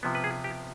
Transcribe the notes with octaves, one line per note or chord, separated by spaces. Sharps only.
C3 F3 B3
B4
G#4
G4